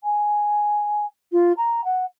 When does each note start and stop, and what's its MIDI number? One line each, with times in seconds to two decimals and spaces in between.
0.04 1.06 80
1.32 1.52 65
1.57 1.84 82
1.84 2.05 78